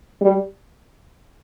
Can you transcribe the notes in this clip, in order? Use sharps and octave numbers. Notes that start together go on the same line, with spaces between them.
G3